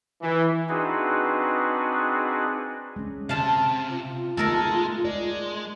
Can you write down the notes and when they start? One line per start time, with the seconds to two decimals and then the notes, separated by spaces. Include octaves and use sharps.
0.22 E3
0.69 C4 D4 D#4 F#4 G#4 B4
2.96 G#3 C#4
3.29 C3 F5 A5
3.88 F4
4.37 G#3 A3 B3 D#4 A4 A#4 A#5
5.05 G#3 D5